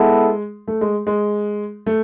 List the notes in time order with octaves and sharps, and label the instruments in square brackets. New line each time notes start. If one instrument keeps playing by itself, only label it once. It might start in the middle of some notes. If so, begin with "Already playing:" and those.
Already playing: [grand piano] G#3 [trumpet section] B3 E4 A4
[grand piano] A3
G#3
G#3
A3